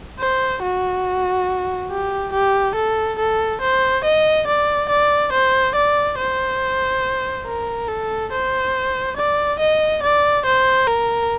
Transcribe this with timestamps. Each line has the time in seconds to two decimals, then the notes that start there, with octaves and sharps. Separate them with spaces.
0.19 C5
0.62 F#4
1.91 G4
2.33 G4
2.76 A4
3.19 A4
3.62 C5
4.05 D#5
4.48 D5
4.90 D5
5.33 C5
5.75 D5
6.19 C5
7.47 A#4
7.89 A4
8.32 C5
9.17 D5
9.59 D#5
10.03 D5
10.46 C5
10.88 A#4